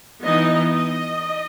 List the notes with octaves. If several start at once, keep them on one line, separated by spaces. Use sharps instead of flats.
E3 B3 D#4 D#5
D#5